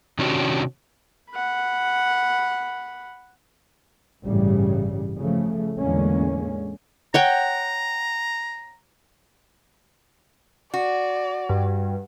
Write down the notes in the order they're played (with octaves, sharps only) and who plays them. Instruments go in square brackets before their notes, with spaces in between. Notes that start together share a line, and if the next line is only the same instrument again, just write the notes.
[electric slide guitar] C3 D#3 C#4 D4 F#4 G4
[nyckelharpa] F#5 B5
[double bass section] A1 G2 C#3 G3
C#3 F3 A3
E2 A2 D3 G#3 A#3 C#4
[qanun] C#5 F#5 G5 [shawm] A#5
[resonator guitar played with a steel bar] F#4 [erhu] D5
[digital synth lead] G2